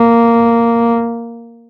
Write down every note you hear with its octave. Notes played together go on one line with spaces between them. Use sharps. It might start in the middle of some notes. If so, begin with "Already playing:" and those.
Already playing: A#3